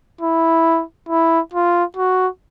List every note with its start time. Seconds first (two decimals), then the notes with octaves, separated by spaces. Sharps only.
0.21 E4
1.09 E4
1.53 F4
1.97 F#4